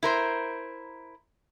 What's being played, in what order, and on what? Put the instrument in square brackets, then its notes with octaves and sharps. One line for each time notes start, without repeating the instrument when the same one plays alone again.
[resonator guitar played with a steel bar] E4 A#4 C5